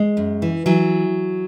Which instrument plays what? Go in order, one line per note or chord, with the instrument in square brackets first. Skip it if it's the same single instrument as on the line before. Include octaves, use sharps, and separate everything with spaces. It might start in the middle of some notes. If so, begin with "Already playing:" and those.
Already playing: [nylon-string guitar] G#3
F#2
E3
E3 F#3